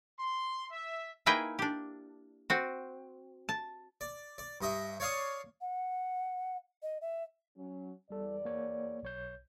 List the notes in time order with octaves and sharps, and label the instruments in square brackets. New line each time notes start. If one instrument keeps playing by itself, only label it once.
[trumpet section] C6
E5
[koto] A#3 D#4 E4 G#4 B4 G5
D4 G4
C4 F#4
A5
[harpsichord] D5
D5
G2 D#5 E5
C#5 D5 F5 C#6 D#6
[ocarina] F#5
D#5
E5
[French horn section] F#3 C#4
[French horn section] E2 D5 [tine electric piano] G3 A4
[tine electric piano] A#3 C#5
B1 C#5 G6